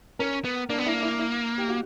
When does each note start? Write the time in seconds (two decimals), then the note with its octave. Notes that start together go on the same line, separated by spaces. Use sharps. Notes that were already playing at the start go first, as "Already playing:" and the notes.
0.19 C#4 A#4
0.45 B3
0.69 A#3 D4
0.78 B3
0.86 A#3 E4
1.03 E4
1.19 E4
1.58 G4
1.69 F#4